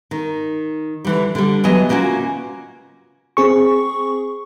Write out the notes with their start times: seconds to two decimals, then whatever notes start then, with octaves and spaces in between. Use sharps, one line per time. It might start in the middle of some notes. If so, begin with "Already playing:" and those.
0.11 D#3
1.05 D3 E3 G3
1.35 D3 G3
1.64 E3 F#3 B3 D#5
1.89 C#3 A#3 C#4 F4 F#4
3.37 C4 G#4 C#6